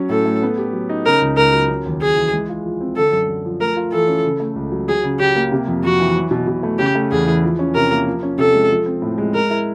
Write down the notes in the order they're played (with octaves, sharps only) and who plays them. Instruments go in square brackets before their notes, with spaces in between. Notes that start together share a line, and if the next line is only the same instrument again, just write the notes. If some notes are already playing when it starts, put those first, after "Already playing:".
Already playing: [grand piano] F#3 C#4
[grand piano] A2 [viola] A4
[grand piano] A3
B3
G4
F#3
D#4
[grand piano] C#3 [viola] A#4
[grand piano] C#2
[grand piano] C#2 [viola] A#4
[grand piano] F#3
C#3
D#2
[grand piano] D#2 [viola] G#4
[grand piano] E3
G#3
F4
F3
C4
[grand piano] D3 [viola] A4
[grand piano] F#2
F#2
F3
[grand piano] A3 [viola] A#4
[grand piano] F4
[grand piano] E3 [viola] A4
[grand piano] C#4
C#3
A3
C#2
F#3
[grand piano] F#3 [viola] G#4
[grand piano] C#3
[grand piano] C#3 [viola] G4
[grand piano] A#3
C3
F2
[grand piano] F2 [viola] F#4
[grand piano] E3
F#3
B2
B2
A3
[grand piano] C#3 [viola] G4
[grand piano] A3
[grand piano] E2 [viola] G#4
[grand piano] E3
F3
C#4
[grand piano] C3 [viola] A#4
[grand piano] A#3
F3
C#4
[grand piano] C3 [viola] A4
[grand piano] G#3
F3
C4
A2
G#3
[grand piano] G#3 [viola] A#4
[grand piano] E4